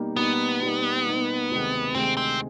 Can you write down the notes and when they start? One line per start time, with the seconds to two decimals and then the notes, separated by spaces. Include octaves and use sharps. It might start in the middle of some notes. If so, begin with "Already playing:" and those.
Already playing: B2 G3 A#3 D#4
0.16 B2 G3 A#3 B3 D#4
0.61 B2 G3 A#3 D#4
1.06 B2 G3 A#3 D#4
1.50 D2 C3 D#3 G#3
1.95 D2 C3 D#3 G#3 C4
2.17 C4